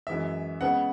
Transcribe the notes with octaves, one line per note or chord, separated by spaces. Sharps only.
F#2 E3 G#3 E5
C#3 G#3 B3 F#5